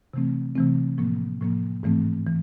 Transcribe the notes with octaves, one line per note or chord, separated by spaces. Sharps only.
C3 E3 A3 C4
C3 E3 A3 C4
A2 F3 A#3
A2 F3 A#3
G#2 E3 A3 C4
E3